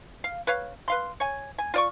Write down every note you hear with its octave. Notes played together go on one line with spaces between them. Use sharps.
F5
B4 C#5 F5
B4 F5 C6
C#5 G#5
G#5
F4 D5 C#6